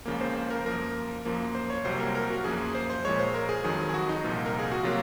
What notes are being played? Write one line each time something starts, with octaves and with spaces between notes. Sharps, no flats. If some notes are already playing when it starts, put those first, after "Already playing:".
C#2 C#3 F3 A#3
C5
C5
A#4
F#2 F3 A#3 A#4
F#2 F3 A#3
C5
C#5
C2 C3 F#3 A#3 C5
A#4
A#4
F#4
F#2 F3 A#3 G#4
C5
C5
A#2 F3 G#3 C#5
C5
A#4
G#4
F2 D#3 F#3 G#4
G#4
F#4
D#4
C2 A#2 F3 A#3
A#4
G#4
F#4
C3 F#3 A#3 F4